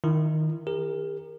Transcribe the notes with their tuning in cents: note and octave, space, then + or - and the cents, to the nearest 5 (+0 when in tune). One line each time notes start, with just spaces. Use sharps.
D#3 +0 E4 +25
G4 +45 A#4 +0